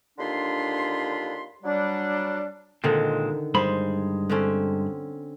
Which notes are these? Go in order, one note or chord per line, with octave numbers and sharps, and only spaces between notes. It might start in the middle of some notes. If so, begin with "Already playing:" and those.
D#2 D3 D4 F4 B5 C6
F#3 G3 D4
A#2 D3 D#3 G#3 C4
G2 G#3 C5 B5
D3 C4 C#4